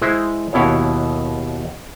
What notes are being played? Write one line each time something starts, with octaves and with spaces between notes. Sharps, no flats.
G#3 E4 C5 D#5
D#2 B2 E4 C#5